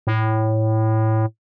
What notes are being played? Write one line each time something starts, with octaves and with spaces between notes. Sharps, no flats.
A2